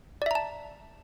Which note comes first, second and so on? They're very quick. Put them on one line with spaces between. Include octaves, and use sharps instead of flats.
D5 E5 A#5 A5